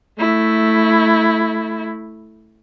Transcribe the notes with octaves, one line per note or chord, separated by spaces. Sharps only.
A3 E4